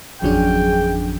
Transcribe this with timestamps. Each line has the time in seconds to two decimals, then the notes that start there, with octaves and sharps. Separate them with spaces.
0.22 G#1 F2 D3 F#3 C#4 D4 G#4 G5